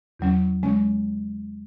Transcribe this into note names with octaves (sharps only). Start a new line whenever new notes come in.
E2 C#3 F#3 C#4
C#3 G#3 C#4